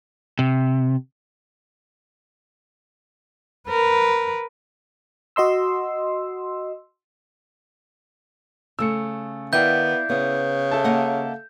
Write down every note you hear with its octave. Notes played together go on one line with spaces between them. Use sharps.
C3
A#4 B4
F#4 D#5 C6 E6
C#3 A3 E6 C#7
D#3 B3 E4 D5 F5 G5 G6
C#3 B3
A4 E5 A5
A#3 D#5 F#5